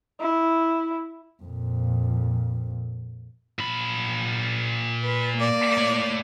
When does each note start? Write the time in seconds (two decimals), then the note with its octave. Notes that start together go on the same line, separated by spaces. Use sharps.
0.20 E4
1.43 F2 A#2
3.59 A#2 B5
5.03 B4
5.37 A#3 D5
5.77 A3 C#5